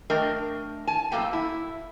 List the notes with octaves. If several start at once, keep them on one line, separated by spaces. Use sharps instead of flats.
A3 D4 A#4 D#5 G5
G#5 A5
F#2 B2 A3 A#3 G5
E4